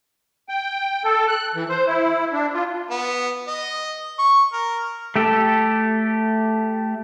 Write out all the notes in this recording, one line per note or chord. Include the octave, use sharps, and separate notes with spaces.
G5
A4
F#6
E3
C5
E4
D4
F4
B3
D#5
C#6
A#4
A3 G4 A4